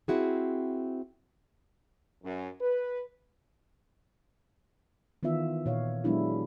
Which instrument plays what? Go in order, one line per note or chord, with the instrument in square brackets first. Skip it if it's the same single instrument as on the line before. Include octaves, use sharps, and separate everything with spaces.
[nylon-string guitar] C4 E4 F#4 G#4
[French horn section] F#2
B4
[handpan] D#3 E3 B3 F4 E5
A#2 C#5 F5
F#3 G#3 B3 D4 E4 G4